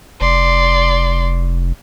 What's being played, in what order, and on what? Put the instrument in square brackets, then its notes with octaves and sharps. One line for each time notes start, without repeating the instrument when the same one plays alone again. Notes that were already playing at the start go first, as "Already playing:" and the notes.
[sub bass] F1 [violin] D5 C6